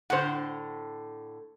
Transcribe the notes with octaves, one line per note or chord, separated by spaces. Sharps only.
A2 D3 C5 F#5